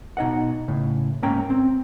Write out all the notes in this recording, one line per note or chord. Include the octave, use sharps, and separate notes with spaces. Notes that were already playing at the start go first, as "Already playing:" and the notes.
B2 D#4 D#5 F#5
A2 C#3
G#2 A#3 C#4 G5 A#5
C4